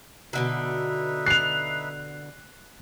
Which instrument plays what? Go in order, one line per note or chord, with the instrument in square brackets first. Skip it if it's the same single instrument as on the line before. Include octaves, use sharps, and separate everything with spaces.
[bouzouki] B2 D3 D#3 [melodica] D#4 B4 E5
[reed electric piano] F#6 [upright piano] C7 F7